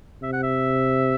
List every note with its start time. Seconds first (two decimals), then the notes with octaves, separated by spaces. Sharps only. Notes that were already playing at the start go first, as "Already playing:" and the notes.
0.22 C3 E5
0.33 F#5
0.43 E5